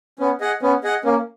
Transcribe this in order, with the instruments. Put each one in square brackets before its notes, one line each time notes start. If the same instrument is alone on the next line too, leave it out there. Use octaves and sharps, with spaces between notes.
[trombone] B3 [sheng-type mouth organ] C#4
[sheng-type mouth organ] G#4 D#5 F#5
[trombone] B3 [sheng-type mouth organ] C#4
[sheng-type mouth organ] G#4 D#5 F#5
[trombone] A#3 [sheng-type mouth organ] C#4